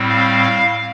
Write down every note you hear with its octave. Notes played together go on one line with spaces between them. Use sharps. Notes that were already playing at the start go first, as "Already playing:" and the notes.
Already playing: A2 G3 C4
F5